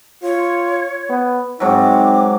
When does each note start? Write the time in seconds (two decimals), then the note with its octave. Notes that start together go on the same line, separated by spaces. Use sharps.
0.23 F4 C#5
1.10 B3
1.60 G#2 F#3 C4 D#4 D6